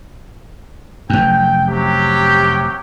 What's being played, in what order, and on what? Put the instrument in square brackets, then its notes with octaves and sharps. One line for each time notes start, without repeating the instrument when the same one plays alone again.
[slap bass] F1 F#2 [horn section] G5
[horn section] C3 F#3 G4